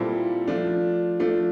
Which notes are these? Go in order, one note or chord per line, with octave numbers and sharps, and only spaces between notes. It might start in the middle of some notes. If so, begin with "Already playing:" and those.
Already playing: A#2 G3 C4 E4 A4
F3 A3 D4
F3 A3 D4